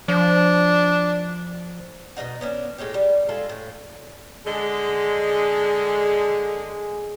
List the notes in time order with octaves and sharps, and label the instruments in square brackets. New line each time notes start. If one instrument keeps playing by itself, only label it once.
[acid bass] F3 [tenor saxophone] D4
[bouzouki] B2 A#3 D#4 F#5
B3 C#4 D4
A2 G#3 C#4 G4
G3
G#3 F4 A4
A2
[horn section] D3 G#3 [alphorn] G#4